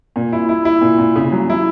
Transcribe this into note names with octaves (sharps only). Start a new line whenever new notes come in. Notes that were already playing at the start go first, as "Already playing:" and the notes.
A#2
E4
E4
E4
A#2
A#2
C#3
F#3
E4